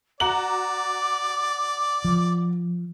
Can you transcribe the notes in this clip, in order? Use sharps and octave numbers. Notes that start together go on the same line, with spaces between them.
F#4 D5 A#5 D6 F#7
F3